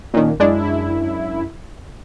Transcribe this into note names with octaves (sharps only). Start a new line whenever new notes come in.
A#2 D#3 A#3 C#4 D4
F#2 G#3 D4 E4